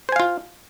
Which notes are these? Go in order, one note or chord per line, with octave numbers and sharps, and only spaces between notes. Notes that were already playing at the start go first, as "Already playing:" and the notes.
F4 C5 F5 G#5